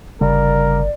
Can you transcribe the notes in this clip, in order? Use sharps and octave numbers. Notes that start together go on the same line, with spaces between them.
G1 C#3 G3 A#4 D5